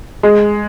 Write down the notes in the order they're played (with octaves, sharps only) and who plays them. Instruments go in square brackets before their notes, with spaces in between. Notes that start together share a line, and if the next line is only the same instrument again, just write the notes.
[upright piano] G#3